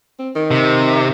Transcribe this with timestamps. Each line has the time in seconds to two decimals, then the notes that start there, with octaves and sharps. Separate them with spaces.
0.19 C4
0.36 D#3
0.51 C3